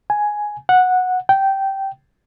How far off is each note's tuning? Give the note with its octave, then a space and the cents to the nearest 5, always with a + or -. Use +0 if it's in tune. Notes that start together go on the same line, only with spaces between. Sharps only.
G#5 +5
F#5 -10
G5 -10